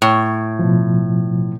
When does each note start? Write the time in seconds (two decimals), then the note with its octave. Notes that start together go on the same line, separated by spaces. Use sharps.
0.02 A2
0.59 B2 F3